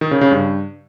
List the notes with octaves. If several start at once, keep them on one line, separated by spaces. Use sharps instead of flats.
D#3
C#3
C#3
G2